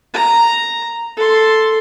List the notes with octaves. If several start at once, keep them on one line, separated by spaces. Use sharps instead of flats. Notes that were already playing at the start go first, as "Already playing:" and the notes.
A#5
A4 C6